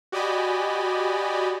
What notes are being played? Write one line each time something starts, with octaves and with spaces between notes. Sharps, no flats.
F#4 G4 D5 D#5 G#5 B5